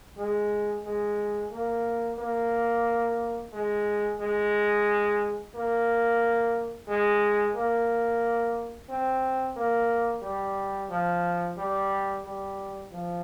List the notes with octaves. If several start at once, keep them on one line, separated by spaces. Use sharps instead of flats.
G#3
G#3
A#3
A#3
G#3
G#3
A#3
G#3
A#3
C4
A#3
G3
F3
G3
G3
F3